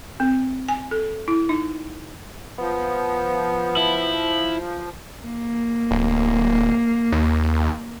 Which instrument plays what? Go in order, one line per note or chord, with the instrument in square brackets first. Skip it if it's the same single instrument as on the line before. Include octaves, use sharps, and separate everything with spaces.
[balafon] C4
G#5
A4
E4
D#4
[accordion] F3 [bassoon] B3
[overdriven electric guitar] E4
[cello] A#3
[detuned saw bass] D1
D#2